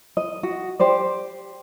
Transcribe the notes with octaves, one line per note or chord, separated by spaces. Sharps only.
D#5
F#4
G4 C5 D5